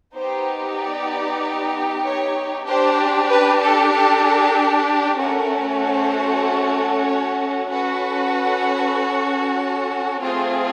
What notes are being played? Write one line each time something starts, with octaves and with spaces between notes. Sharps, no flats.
B3 D#4 G4 C5
D5
C#5
D4 G4 C5
B4
A4
A4
A3 C#4 F#4 A4 A#4
C5
C#5
C#4 F#4 A4 B4
A3 C4 F4 G#4 C5